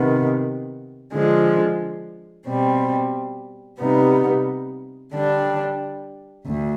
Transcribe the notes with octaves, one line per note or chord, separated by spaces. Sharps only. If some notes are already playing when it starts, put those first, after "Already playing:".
Already playing: C3 D#3 B3
D3 F3 G#3
B2 G3 C4
C3 G3 B3 D#4
D3 G3 D4
D2